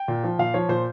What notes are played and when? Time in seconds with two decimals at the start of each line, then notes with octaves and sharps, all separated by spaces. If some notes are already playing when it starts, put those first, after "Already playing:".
Already playing: G5
0.08 A#2
0.24 F3
0.39 A#2 F5
0.54 F3 C#5
0.69 A#2 C5